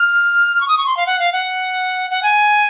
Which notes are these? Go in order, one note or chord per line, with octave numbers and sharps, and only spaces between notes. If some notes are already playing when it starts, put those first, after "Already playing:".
Already playing: F6
C#6
D#6
C#6
C6
F5
F#5
F5
F#5
F#5
G#5